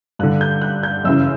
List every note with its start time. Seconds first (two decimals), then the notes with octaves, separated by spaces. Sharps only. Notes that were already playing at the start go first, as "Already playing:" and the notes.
0.19 G2 D3 F#6
0.41 G6
0.61 F#6
0.83 G6
1.04 F#2 C#3 E3 E6